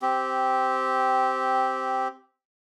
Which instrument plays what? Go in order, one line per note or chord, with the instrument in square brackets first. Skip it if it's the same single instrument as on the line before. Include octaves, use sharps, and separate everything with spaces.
[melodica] C4 G4